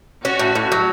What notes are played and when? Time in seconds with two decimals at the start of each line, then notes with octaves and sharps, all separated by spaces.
0.25 C#4 F#4
0.39 A2
0.55 A2
0.72 F#3